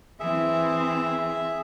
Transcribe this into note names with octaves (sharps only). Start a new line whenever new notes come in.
E3 C4 G#4 E5